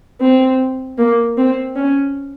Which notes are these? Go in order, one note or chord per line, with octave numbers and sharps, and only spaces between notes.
C4
A#3
C4
C#4